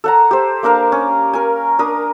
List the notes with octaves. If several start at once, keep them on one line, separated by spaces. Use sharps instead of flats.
A4 F#5 A#5
G4 C5
A#3 D4 A#4 F5
C#4
A#4 G#5
D4 A#4 D#6